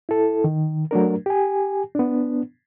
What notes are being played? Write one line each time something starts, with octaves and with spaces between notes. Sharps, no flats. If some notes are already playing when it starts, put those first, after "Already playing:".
E4 A4
D#3
F#3 A3 D4 A#4
G4 G#5
B3 D4